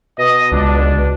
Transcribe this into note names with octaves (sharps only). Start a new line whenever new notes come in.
B2 D#5
C#2 D4